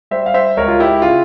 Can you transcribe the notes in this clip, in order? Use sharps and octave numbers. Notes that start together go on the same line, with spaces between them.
G3 C5 E5
F5
C5 E5
C#2 A#4 C#5
F4
E4 G4
C#3 F4